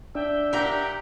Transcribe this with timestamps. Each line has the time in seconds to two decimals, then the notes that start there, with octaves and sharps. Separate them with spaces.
0.15 D4 E5 G5
0.53 A#2 G4 E5 F#5 G5 A#5